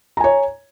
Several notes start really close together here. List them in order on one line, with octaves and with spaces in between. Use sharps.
A#5 G#5 C#5